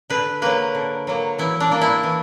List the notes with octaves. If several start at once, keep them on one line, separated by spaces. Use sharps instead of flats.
D3 B4
F#3 A#3 B4
D3
F#3 A#3
E3 E4
D4
A#3 D4
E4
E3